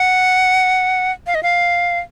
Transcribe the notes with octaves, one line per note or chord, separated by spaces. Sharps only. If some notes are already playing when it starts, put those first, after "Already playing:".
Already playing: F#5
F5
D#5
F5